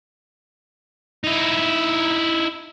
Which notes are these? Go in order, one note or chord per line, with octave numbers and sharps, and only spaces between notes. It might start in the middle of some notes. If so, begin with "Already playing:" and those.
D#4 E4